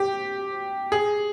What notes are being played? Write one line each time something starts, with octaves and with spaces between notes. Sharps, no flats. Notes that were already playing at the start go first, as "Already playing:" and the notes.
Already playing: G4
G#4